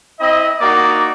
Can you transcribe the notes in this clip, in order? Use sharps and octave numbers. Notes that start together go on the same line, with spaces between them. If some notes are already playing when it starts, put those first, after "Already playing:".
C4 E4 D#5
A#3 D#4 F#4 D5